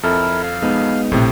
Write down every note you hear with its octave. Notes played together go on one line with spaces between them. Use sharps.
F2 E4 A4 A#4
F5
G#3 B3 D#4
A#1 A2 C3